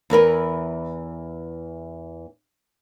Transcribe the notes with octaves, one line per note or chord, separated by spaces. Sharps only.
E2 E3 A#4 B4